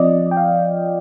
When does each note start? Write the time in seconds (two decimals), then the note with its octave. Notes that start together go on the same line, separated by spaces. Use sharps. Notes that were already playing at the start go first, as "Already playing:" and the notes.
Already playing: F3 C4 F4 D5 D#5
0.31 G5
0.37 F5